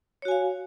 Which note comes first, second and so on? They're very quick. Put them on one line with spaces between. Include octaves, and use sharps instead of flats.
C#5 F#4 G#5 F5